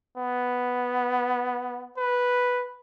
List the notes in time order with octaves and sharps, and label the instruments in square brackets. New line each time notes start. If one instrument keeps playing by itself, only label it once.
[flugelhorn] B3
B4